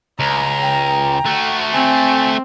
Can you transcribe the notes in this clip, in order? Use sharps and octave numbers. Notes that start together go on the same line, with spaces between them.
C#2 A#5
G5
A3 F#4
C4 G#5